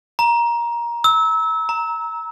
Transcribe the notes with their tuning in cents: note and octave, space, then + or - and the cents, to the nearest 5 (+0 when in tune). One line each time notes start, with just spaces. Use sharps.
A#5 +20
E6 -25
A#5 +0